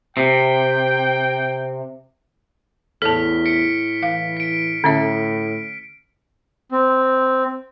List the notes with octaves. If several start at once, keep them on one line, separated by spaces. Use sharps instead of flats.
C3 G5
E2 A2 A4 A5 F6 B6
B6 C#7 D7
E3 F5
B6 D7
A2 D3 C#4 E5
C4